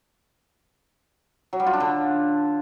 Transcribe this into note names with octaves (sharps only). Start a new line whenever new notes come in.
F#3
G3
F4
D4
D3